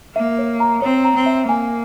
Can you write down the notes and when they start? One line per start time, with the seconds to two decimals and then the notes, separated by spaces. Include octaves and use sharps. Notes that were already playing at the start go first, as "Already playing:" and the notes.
0.15 A#3 E5
0.39 C#5
0.60 A#5
0.82 C4 C#5
1.05 A#5
1.16 C4
1.26 E5
1.48 A#3 G#5